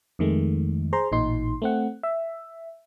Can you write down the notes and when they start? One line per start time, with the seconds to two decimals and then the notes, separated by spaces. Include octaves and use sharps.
0.19 F2 D#3 G#3 A3
0.93 G#4 C5 A#5 C6
1.12 A1 A#2 D#4 C6
1.62 A3 C4 F#5
2.03 E5